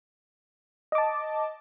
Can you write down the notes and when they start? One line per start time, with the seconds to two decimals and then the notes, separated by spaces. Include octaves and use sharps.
0.92 D#5
0.95 D6
0.98 A5